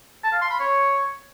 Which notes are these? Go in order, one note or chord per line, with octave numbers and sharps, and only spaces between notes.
A5
F5
C6
B5
C#5